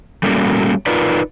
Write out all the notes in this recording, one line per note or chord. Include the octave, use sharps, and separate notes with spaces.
G3 A3 A#3 C#4 F4 F#4
D#4 F4 A#4 B4 D5